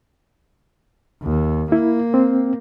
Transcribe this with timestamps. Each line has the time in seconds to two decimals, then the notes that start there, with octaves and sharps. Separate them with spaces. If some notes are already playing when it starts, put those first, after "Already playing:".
1.23 D#2
1.72 A#3 E4
2.14 C4